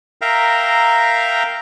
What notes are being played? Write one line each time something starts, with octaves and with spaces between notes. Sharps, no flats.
A#4 E5 F5 G5 A#5